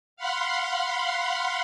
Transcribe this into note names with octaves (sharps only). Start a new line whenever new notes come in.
F5 F#5 B5 C6